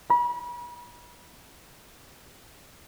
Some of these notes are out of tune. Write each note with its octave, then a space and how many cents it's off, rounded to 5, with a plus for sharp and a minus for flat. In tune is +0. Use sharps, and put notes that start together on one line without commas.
B5 -35